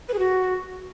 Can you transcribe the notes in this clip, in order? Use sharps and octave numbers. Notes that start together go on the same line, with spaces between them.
B4
G#4
F#4